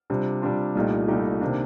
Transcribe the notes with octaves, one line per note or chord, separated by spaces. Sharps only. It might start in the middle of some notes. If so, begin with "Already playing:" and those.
C3 G3 D4 F4
C3 G3 D4 F4
C2 A#2 A3 D#4 G4
C2 A#2 A3 D#4 G4
C3 D#3 A#3 D4